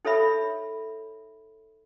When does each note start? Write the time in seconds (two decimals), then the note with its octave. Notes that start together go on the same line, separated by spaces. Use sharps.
0.05 D#4 A4 C#5 E5 B5